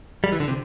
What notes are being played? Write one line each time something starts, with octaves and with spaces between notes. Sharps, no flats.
G3
E3
D3
C3